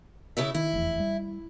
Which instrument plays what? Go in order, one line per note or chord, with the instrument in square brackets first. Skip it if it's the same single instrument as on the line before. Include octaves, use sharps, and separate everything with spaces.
[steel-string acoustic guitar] C#3 E4 E5
[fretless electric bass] D#3 [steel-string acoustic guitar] E4
[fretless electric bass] F1 E2
G3